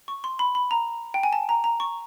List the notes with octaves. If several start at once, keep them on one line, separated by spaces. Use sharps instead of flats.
C#6
C6
B5
B5
A#5
G5
G#5
A5
A#5
A#5
C#6